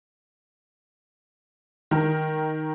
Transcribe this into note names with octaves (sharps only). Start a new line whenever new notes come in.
D#3 A#4